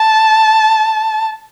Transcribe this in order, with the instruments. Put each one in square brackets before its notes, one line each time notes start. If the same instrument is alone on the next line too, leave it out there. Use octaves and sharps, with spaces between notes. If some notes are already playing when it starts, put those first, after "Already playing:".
Already playing: [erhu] A5